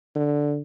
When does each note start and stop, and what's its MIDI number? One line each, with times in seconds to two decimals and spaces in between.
0.15 0.62 50